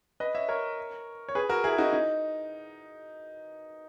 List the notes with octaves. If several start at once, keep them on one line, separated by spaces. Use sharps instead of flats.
B4 D#5
C#5 E5
A#4 C#5
C#5
G#4 B4
F#4 A#4
E4 G#4
D#4 F#4
D#4